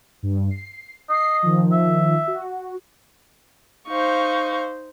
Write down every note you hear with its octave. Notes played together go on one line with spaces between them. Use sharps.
G2
C7
D#5 C7
D#3 F3
E5
F#4
D#4 C5 F5 C#6